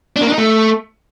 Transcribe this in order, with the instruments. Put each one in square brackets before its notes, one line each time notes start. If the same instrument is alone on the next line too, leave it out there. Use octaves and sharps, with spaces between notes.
[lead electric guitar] D4
A#3
D4
D#4
A3